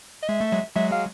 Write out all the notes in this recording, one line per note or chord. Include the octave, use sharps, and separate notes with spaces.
D#5
G#3 E5
A3
F#3 G#3
F#3 G#3 E5
F5